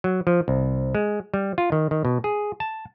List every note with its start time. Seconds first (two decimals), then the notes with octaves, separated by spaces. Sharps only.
0.04 F#3
0.27 F3
0.48 C2
0.95 G#3
1.34 G3
1.58 F4
1.72 D#3
1.91 D#3
2.05 B2
2.24 G#4
2.60 A5